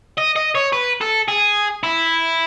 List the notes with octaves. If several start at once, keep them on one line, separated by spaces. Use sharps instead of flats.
D#5
D#5
C#5
B4
A4
G#4
E4